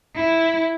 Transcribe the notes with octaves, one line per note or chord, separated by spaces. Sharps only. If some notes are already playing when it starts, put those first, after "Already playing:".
E4